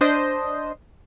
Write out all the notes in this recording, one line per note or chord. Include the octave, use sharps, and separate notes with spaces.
D4 C5 D#5